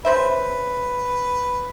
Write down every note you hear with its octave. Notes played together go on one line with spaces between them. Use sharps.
C#3 B4 C5 E5